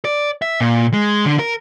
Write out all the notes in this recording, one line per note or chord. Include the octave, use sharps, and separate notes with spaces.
D5
E5
A#2
G#3
D3
A#4